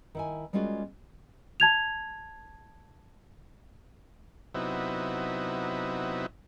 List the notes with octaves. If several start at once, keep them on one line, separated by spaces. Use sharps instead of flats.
D#3 E4 G#5
G3 G#3 A#3 C#4 F4 F#4
A5 G#6 F7
C3 F#3 B3 D#4 E4